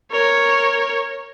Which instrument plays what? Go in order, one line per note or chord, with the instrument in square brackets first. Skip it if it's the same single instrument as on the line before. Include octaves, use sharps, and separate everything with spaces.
[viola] A#4 C#5